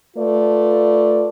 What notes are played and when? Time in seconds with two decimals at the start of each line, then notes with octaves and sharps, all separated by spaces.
0.17 A3 F4 B4 D5